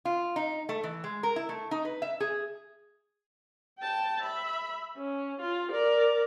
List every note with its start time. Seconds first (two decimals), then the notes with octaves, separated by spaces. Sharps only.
0.05 F4
0.36 D#4
0.69 A3
0.83 E3
1.04 G#3
1.23 A#4
1.36 E4
1.49 A3
1.71 D#4
1.85 B4
2.02 E5
2.20 G#4
3.79 G5 A5
4.22 E5 B5
4.97 C#4
5.40 F4
5.71 A#4 D5